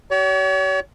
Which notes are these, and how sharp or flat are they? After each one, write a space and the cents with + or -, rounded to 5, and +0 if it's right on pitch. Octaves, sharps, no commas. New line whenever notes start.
G4 -45 C#5 +40